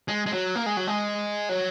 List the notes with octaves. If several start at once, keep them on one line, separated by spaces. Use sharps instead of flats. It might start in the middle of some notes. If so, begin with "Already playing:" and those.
G#3
G#3
F#3
A#3
G#3
F#3
G#3
F#3